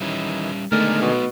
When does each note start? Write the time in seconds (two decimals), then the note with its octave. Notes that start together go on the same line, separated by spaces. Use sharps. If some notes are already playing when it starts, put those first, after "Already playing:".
0.01 D#3 E3 G3 C#4
0.72 D3 D#3 G#3 A3 B3 D#4 A#4
1.02 B2